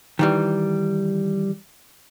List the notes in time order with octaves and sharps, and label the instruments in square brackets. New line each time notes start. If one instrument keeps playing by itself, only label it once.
[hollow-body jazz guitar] D#3 E3 G3